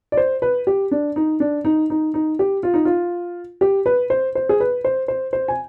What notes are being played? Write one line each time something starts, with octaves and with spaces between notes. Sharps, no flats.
D5
C5
B4
G4
D4
D#4
D4
D#4
D#4
D#4
G4
F4
D#4
F4
G4
B4
C5
C5
G#4
B4
C5
C5
C5
G#5